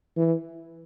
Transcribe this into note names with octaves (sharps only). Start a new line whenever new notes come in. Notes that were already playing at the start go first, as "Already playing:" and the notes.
E3